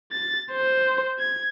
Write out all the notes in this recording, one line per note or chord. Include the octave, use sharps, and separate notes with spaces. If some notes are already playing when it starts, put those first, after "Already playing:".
A6
C5
G#6